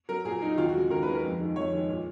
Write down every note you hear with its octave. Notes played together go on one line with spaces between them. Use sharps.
F#3 A#4
A#2 G#4
F#3 D#4
D#2 F4
F#4
C#3 G#3
D#2 A#4
C#3 G#3 B4
A#4
F2
D#3 G#3
F2 C#5
D#3 G#3
A#2